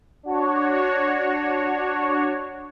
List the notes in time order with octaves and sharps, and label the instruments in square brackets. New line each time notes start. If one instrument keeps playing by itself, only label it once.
[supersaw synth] D4 F#4 C#5